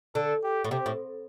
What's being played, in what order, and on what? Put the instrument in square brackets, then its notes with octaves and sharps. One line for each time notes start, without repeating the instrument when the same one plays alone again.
[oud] D3 [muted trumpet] A4
[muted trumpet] G4
[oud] A2
[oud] C3 [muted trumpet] G4
[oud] A2